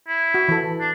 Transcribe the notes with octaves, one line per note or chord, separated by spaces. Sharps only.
E4
F#4
E3 A4
D4